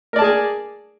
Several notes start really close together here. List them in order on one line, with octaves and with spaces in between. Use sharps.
A#4 D5 A5 G#4 G#5